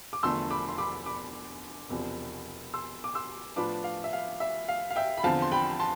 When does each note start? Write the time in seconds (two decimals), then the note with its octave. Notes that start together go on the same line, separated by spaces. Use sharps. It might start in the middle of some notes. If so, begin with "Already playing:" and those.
0.13 D6
0.23 E1 E2 D3 F3 A3 C6 E6
0.50 B5 D6
0.69 C6
0.78 B5 D6
1.06 B5 D6
1.89 E1 E2 C3 F3
2.74 C6 E6
3.04 D6
3.15 C6 E6
3.56 A2 F3 B3 D4 F4 B5 D6
3.84 F5
4.04 E5
4.13 F5
4.40 E5
4.69 F5
4.90 F5
4.96 E5 G5
5.17 B5
5.23 E2 D3 F3 C4 F5 A5
5.42 C6
5.52 G5 B5
5.80 A5 C6